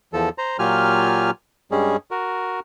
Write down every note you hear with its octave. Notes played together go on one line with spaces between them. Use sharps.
E2 F3 A4
C5 A#5
A#2 F#3 F4 G4 G#5 F6
G2 G3 G#3 C#4 G#4
F#4 A#4